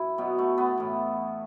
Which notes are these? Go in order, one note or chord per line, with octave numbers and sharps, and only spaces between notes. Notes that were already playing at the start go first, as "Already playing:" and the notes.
Already playing: F#2 E4
B2 F#3 B3
A3
B3
A2 E3